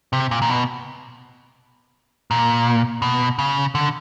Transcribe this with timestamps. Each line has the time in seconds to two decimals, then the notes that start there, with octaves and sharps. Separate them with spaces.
0.13 C3
0.31 A#2
0.42 A#2
0.50 B2
2.31 A#2
3.02 B2
3.39 C#3
3.75 D3